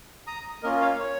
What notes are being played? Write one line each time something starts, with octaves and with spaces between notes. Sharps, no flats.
A#5 D#6
A#3 C#4 F4 A#4 D#5
C#5 F5
C#5